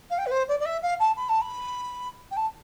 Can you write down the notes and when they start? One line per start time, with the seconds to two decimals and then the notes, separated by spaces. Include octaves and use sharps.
0.10 F5
0.18 G5
0.26 B4
0.31 C5
0.48 D5
0.59 D5
0.65 E5
0.82 F5
0.99 A5
1.16 B5
1.28 A5
1.41 B5
2.31 G5
2.36 A5